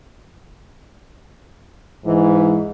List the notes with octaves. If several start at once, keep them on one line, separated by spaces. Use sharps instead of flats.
G#2 E3